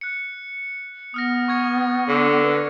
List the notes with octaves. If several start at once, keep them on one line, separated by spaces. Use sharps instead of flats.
F#6 C#7
B3 D#6 F6 A#6
C#6 G#6 C#7
D3
B4